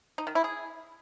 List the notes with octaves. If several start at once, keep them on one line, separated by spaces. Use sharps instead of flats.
D#4
D#3
E4
G#4